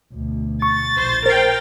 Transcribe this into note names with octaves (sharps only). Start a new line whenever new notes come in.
D2 B2
C#6 A6
A#1 C5
A#4 C5 G5 C7